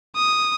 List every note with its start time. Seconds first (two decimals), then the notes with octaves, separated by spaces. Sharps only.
0.16 D#6